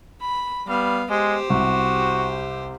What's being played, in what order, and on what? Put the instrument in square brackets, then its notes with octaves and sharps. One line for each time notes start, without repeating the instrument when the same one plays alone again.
[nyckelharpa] B5
[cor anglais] G3 [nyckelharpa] B3 F5
[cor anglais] G#3 [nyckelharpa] G4 C5
[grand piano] C2 [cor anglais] F#4